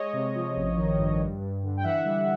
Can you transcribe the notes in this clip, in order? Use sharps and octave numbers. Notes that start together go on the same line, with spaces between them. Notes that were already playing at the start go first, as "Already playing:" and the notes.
Already playing: G#3 C#5 D#5
C3
F3
A1
D#3
G2
G2
G2
D3
G5
E3 E5 F#5
G3